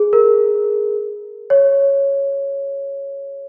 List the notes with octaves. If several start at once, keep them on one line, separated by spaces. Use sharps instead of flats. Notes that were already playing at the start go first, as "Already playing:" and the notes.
Already playing: G#4
A#4
C#5